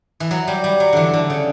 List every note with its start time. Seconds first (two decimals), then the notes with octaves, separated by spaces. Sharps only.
0.20 E3
0.31 F#3
0.48 G3
0.64 G3
0.80 F#3
0.93 D3 E3
1.13 D3
1.30 C#3